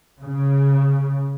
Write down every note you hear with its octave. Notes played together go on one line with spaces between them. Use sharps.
C#3